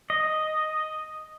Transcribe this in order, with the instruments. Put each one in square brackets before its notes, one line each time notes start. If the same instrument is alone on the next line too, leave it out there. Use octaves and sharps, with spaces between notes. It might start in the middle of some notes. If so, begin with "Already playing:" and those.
[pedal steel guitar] D#5